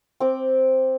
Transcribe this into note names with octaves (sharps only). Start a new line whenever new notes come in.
C4 D6